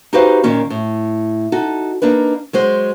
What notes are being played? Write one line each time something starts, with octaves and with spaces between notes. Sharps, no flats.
D#4 F#4 G4 B4 C5 F5
A#2 D#3 A#3 C#4
A2
D#4 F#4 A4
A#3 D4 D#4 B4
F#3 G#3 C5